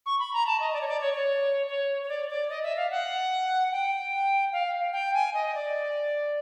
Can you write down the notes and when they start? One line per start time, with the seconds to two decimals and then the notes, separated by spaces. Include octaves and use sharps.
0.06 C#6
0.19 B5
0.34 A#5
0.47 A5
0.60 D#5
0.73 D5
0.81 C#5
0.88 D5
1.01 C#5
1.14 C#5
1.68 C#5
2.03 C#5
2.09 D5
2.29 D5
2.50 D#5
2.63 E5
2.77 F5
2.91 F#5
3.72 G5
4.52 F5
4.93 G5
5.14 G#5
5.34 D#5
5.55 D5